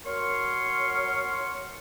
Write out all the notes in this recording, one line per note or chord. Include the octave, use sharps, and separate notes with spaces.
F#3 A#4 C#5 C6 C#6 F6